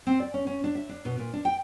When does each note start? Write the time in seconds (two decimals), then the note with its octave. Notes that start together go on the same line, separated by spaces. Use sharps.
0.07 C4
0.20 D5
0.34 C#4
0.47 C#4
0.64 D4
0.75 E5
0.89 D4
1.05 B2
1.19 A#2
1.33 D4
1.45 G5